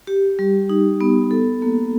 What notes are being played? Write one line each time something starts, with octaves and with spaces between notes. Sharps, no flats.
G4
G3
D#4
B3
A4
A#3